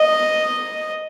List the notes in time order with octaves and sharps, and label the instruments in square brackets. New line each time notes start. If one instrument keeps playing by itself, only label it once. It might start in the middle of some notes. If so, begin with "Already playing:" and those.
Already playing: [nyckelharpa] D#5